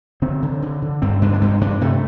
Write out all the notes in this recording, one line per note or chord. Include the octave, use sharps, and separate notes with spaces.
D3 C4
D3
D3
D3
G2 C4
G2 D4
D4
G2 C4
G2 D4
C3 A3